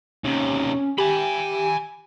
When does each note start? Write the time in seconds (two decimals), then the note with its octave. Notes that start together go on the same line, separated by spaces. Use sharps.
0.25 D#2 C3 C#4
0.98 G4 G#5 B5